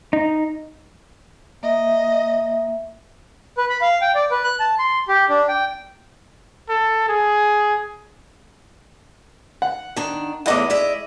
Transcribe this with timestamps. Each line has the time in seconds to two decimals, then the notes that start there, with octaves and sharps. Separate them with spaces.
0.13 D#4
1.63 A#3 D#5 E5
3.56 B4
3.69 B5
3.81 F5
4.01 G5
4.15 D5
4.31 B4
4.44 F#6
4.60 A5
4.79 C6
5.08 G4
5.29 D4
5.48 G5
6.69 A4
7.09 G#4
9.62 F#5
9.96 D#3 D4
10.46 E2 A2 E4 D#5 F#5 D6
10.70 G#3 D5 E5